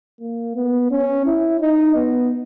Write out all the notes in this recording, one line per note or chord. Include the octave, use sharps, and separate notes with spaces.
A#3
B3
C#4
E4
D#4
B3